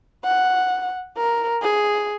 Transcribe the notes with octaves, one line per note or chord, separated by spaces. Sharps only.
F#5
A#4
G#4